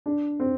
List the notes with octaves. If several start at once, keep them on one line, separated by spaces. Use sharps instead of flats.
D4
C4